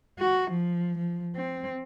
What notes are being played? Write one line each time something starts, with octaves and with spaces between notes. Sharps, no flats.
F#4
F3
F3
C4